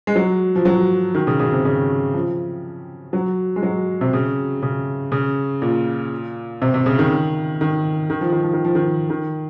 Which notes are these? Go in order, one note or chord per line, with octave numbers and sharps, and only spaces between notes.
G#3
F#3
F3
F#3
D#3
C#3
C#3
C3
C#3
F3
F#3
G#3
F#3
C3
C#3
C#3
C#3
A#2
C3
C3
C#3
D#3
D#3
D#3
F3
D#3
F3
D#3
F3
D#3
D#3